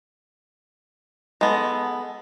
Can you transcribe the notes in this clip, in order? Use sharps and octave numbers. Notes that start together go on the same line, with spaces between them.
G#3 B3 A4